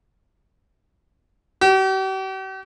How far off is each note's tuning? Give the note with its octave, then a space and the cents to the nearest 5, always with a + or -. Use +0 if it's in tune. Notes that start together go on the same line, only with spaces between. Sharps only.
G4 -45